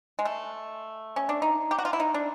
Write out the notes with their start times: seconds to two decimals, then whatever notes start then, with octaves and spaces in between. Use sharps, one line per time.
0.19 G#3
0.25 A3
1.16 C#4
1.29 D4
1.42 D#4
1.71 G4
1.79 F#4
1.85 F4
1.93 E4
2.00 D#4
2.14 D4